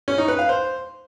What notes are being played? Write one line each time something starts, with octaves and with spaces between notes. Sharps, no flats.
C#4
D#4
B4
F5
C5